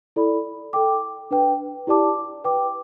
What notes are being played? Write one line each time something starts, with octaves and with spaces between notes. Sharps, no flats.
E4 A4 D5 B5
A4 G5 D6
D4 B4 G5
E4 G4 D5 A5 D6
B4 G5 D6